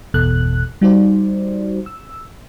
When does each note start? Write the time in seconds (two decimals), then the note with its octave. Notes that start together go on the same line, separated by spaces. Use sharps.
0.14 G#1 E2 B2 A4 F#6
0.81 G3 D#4 F#4 C5 D5
1.86 E6